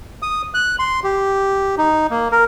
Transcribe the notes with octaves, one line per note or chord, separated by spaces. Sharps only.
D#6
F#6
C6
G4
D#4
A#3
A#4